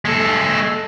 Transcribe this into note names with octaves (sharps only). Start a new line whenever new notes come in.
G#3 A4